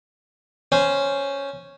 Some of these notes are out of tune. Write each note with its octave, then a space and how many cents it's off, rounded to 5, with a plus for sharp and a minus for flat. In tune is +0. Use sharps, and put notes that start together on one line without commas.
C#4 +0 C5 -10